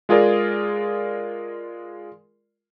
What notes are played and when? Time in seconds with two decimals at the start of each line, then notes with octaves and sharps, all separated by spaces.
0.09 G#3 F4 G#4 A#4 D5